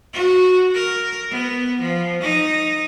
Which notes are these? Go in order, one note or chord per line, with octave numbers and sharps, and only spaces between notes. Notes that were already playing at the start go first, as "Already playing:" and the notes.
F#4
A#4
B3
F3
D#4